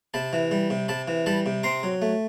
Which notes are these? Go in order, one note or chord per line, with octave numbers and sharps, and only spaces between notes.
C3 A5 B5
E3
G3
C3
C3 A5 B5
E3
G3 A5 B5
C3
C4 A#5 C6
F#3
A3